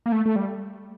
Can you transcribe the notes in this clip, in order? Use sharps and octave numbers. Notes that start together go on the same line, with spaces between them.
A#3
A3
A3
G3